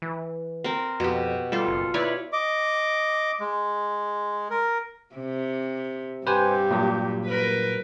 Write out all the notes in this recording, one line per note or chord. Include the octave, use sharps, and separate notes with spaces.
E3
C4 A#4
F2 B2 G4
G3 F4 A4
F#1
E4 B4 C#5 D5
D#5 D6
G#3
A#4
C3
G2 G4 B4 C5 G#5
A#2 F#3
A#4 B4